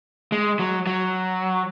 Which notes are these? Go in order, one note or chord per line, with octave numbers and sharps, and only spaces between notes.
G#3
F#3
F#3